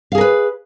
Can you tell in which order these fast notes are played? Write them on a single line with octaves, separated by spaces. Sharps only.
F5 G#4 A#4 B4